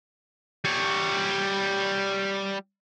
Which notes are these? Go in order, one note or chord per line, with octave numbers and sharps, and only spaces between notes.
G3 C#5